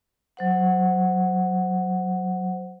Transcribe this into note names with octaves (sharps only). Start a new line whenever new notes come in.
F#3 C5 F#5